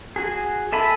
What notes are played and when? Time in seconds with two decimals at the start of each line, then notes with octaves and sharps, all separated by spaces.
0.16 F#4 G#4
0.72 A4 E5 G#5 B5